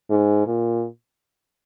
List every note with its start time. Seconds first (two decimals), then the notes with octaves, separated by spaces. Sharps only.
0.10 G#2
0.47 A#2